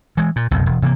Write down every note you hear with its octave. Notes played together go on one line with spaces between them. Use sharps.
E3 G#3
A#2
F#1 B1 F2 C3
E1
C3 E3 A3 A#3